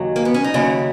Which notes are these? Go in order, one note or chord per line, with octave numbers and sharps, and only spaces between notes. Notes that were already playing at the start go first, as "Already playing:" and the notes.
Already playing: D#2 C#3 F#3 D#4
A#3
B3
C#4
D#4
D#2 C#3 F#3 E4